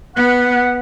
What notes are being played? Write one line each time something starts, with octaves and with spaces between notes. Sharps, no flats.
B3 F#5